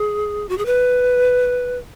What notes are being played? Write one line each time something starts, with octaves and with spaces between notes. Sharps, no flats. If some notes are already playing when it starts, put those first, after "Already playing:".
Already playing: G#4
F#4
G#4
B4